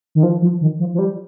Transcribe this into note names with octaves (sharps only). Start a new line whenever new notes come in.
D#3
F3
F3
D#3
F3
F3
G3